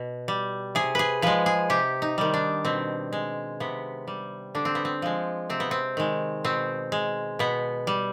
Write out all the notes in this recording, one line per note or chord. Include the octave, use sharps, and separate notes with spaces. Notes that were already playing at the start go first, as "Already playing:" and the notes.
Already playing: B2
G3
C3 G#4
G#4 B4
F3 G#3 B4
G#4
C3 G4
D#4
D#3 G3
D4
B2 C4
G#3
C3 B3
G3
D3 D4
C4
B3
C4
F3 G#3
C3 C4
B3
C4
D#3 G#3
B2 C4
G#3
B2 B3
G3